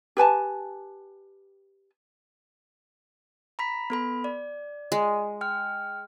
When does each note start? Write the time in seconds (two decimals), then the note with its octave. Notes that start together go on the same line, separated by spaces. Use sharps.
0.17 G4 B4 G#5 A5
3.59 A#5 B5 B6
3.90 B3 A4 B5
4.24 D5
4.92 G#3
5.41 G5 F6